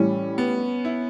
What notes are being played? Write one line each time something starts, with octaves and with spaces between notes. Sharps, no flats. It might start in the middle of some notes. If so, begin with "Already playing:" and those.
Already playing: A2 E3 G3 C#4
B3
E4